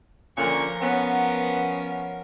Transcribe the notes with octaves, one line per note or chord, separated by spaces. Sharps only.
A#2 D3 F3 C#4 A#4 C#6
B3 C#4 F#5